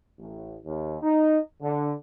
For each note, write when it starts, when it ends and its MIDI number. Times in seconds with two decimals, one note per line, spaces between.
0.19 0.57 33
0.66 0.98 39
1.03 1.38 63
1.62 1.93 50